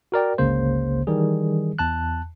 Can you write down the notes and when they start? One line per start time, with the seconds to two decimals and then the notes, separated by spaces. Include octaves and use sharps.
0.12 F#4 A#4 D5 G5
0.38 G1 C#2 C#3 A#3 C5
1.07 D#3 E3 G3 G#4
1.79 E2 A5 F#6